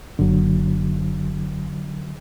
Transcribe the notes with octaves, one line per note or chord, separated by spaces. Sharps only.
F#1 D3 F#3